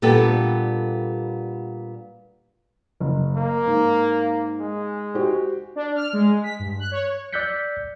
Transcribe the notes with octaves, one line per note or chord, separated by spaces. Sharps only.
A#2 G3 B3 D4 G4 A4
F#1
A#3
G#2
G#3
F#4 G4 C5
D4
F6
G#3
B6
G2
F#6
C#5
D5 E6 F#6 G6 B6 C#7